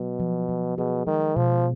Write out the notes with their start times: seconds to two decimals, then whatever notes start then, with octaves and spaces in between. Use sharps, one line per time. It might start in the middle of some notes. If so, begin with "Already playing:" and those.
Already playing: B2 F#3
0.20 F3
0.49 F3
0.78 B2 G#4
1.07 D#3 G#3
1.36 B2 F3